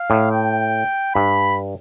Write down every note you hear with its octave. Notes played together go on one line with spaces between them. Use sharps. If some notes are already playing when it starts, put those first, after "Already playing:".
Already playing: F5
A2
G5
G2 B5